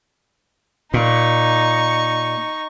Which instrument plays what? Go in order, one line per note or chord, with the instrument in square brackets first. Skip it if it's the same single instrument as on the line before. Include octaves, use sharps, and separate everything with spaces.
[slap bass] A#2 [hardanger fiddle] D#4 C#6